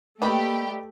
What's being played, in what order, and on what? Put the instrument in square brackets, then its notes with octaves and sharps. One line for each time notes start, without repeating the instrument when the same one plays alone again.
[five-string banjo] D#3 G3 G5 [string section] A3 G4 [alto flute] A#3 [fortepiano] B4 B5